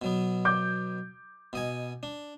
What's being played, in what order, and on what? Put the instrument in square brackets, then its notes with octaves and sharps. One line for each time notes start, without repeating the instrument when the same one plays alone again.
[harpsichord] B2 F#3 B3
[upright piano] D6 G6
[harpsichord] B2 D#5 G#5
D4